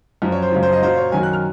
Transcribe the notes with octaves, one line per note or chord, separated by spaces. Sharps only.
F#2 F3
C#5
C5
F#2 C#3 F3
C5
D#5
A#2 F#3 C5
C#5
F#2 D#3 F#3 G#5
F#6
F6